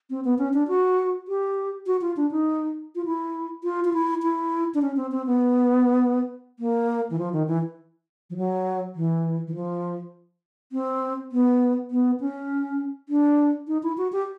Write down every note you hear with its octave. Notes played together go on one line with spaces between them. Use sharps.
C4
B3
C#4
D4
F#4
G4
F#4
F4
D4
D#4
F4
E4
F4
F4
E4
E4
D4
C#4
C4
C4
B3
A#3
E3
F3
D#3
E3
F3
F#3
E3
E3
F3
C4
B3
B3
C#4
D4
D#4
E4
F#4
G4